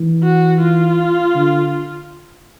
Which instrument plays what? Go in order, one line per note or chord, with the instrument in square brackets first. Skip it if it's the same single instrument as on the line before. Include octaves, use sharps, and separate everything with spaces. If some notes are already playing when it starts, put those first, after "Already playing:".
Already playing: [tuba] E3
[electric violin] F#4
F4
[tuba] D3